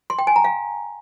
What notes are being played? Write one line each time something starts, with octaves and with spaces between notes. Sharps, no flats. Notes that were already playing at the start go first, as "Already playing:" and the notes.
C6
G5
G#5
A#5
F5